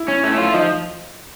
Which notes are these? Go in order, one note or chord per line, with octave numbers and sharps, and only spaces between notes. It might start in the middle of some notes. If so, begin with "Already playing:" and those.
Already playing: E4
C#4
A3
F4
F3 D#4